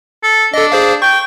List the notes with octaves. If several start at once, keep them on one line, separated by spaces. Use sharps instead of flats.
A4
D4 A4 D#5
G#4 C5 F5
G5 C#6